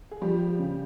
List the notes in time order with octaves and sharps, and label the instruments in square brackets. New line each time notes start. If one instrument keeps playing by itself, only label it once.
[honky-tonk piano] G#4
[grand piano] F3 [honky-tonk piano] G3 G4
[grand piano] C#3